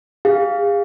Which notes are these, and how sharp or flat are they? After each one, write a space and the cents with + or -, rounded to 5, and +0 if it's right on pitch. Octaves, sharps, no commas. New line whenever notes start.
G#4 -40 F5 +0